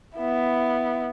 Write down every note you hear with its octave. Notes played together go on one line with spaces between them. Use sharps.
B3 E4